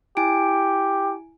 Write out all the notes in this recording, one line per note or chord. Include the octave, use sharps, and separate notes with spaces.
E4 G4 G#5 D7